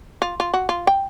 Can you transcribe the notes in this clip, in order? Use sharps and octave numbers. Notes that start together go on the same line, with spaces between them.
F4
F4
F#4
F4
G5